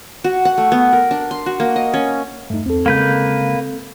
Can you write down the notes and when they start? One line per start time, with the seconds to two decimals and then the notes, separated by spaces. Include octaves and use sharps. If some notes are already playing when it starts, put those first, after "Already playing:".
0.24 F#4
0.45 F#5
0.58 A3
0.72 B3
0.93 A#4
1.11 D4
1.31 C6
1.46 F#4
1.60 A#3
1.76 D#5
1.94 C#4
2.50 E2 G2 A3 D#4
2.66 E2 C4 A4
2.86 C#3 G#3 A#3 B4 G6